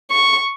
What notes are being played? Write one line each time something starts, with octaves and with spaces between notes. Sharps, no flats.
C#6